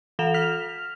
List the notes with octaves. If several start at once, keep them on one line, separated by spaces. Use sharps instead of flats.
E3 A4 F#5 E7 F7
F6 B6 F7